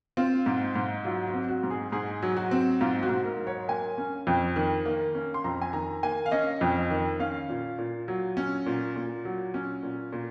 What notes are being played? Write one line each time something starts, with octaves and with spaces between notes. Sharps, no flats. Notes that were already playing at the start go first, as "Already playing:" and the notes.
C4 F4
G#2
G#2
F#3 F4
F#4
C4
F#4
G#2
G#4
G#2 G#4
F#3
F#4
C4
G#2 F4
F#4
G#2
A#4
F#3
C#5
A#3 G#5
C#4
F2
D#3
A#3
C#4
C6
F2 A#5
G#5
D#3 A#5
A#3 G#5
F5
C#4 D#5
F2
D#3
C#4 F5
A#2
A#2
F#3
C#4
A#2
A#2
F#3
C#4
A#2
A#2